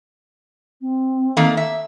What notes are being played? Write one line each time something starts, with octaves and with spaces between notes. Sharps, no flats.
C4
D#3 A3 A#3
E5